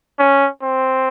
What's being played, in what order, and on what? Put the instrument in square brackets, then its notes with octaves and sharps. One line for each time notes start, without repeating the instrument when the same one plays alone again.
[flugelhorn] C#4
C4